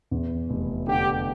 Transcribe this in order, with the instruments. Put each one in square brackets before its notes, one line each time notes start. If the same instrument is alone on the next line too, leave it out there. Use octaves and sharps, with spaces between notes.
[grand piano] E2
F1
[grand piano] D3 [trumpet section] G4